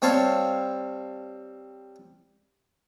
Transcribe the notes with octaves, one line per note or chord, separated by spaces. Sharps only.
G3 C4 C#5 F5 A5 C6